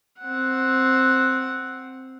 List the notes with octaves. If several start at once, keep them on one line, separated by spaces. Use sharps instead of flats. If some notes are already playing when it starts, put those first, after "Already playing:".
C4 F#5